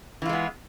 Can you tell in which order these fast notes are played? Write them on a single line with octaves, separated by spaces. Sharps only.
E3 F4 G#3 B3